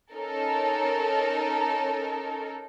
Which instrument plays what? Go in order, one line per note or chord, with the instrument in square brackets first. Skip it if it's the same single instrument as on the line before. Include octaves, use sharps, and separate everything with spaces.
[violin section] C#4 D#4 A4 A#4